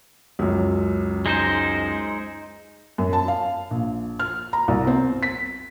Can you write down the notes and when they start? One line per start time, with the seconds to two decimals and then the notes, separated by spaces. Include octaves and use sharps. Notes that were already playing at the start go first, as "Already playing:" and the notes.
0.39 C#2 F#2
1.26 G#3 D#4 C5
2.98 F#2
3.13 A5
3.28 F5
3.71 A#1
4.19 F6
4.53 A#5
4.68 C2
4.87 C4
5.23 B6